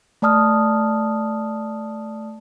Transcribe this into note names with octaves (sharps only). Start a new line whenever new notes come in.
A3 D5 A5 D#6 F6